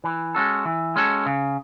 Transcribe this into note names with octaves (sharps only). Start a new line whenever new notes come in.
E3
G#3 C#4 F#4 A4
E3
G#3 C#4 F#4 A4
C#3